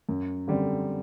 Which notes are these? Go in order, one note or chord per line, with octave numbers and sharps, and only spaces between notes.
F#2
D3 G3 C4